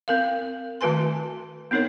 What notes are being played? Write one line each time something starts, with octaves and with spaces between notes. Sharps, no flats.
C4 A#4 F5
D#3 A3 F#4 B4 G#5 C6
B3 C4 D#4 A#4 C#5